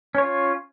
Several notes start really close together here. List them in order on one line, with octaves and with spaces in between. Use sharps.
C#4 C#5 F4